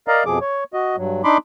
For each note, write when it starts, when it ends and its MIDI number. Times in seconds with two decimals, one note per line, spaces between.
0.08 0.24 70
0.08 0.24 74
0.08 0.24 75
0.08 0.24 77
0.08 0.24 82
0.26 0.39 41
0.26 0.39 47
0.26 0.39 53
0.26 0.39 68
0.26 0.39 86
0.41 0.64 73
0.74 0.96 66
0.74 0.96 75
0.97 1.22 43
0.97 1.22 54
1.24 1.38 62
1.24 1.38 63
1.24 1.38 83
1.24 1.38 84
1.24 1.38 86